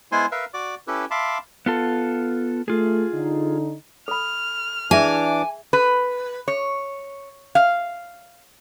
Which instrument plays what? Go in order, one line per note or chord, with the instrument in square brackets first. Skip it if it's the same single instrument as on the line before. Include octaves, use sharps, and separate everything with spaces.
[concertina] G#3 B3 E4 C5 G#5 C6
A#4 B4 E5 F5
F#4 D5 D6
C#4 E4 G4 A4 B4
E5 F5 A5 B5 C6 D6
[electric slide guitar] B3 F4 A4
[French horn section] A3 [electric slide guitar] F4 G#4
[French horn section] D3 D#4
[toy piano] A4 B5 [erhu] F6
[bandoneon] E3 D4 D6 [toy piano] G#4 E5 [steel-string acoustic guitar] G#5
[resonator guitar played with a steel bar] B4
C#5
F5